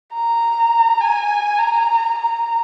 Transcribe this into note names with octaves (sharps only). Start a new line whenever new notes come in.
A#5
G#5
A#5
A#5